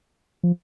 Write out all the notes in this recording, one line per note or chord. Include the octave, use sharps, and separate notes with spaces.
F3